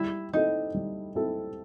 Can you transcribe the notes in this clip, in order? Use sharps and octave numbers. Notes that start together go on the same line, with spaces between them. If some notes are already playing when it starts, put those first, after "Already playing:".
Already playing: G3 E4
C4 D#4 E4 A4
G3
C4 E4 A4